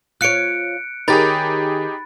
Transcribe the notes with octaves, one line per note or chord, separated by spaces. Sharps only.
F4 C#5 F#6 C#7 D7
D#3 D#4 G4 G#4 A#4 C#5 B5 A6